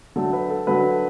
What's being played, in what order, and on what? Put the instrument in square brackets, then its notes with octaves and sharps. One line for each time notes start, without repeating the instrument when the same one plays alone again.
[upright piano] D3 F#3 A3 A4
B4
A4
D3 F#3 A3 B4